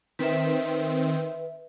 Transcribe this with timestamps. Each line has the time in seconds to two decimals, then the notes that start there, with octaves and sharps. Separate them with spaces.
0.19 D#3 C4 B4 E5